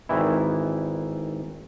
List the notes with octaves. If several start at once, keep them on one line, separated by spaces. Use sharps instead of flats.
G#1 D#3 E3 E4